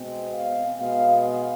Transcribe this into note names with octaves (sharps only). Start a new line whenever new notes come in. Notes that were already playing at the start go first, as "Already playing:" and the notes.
Already playing: B2 G#3 C4
F5
B2 G#3 B3 F5
F5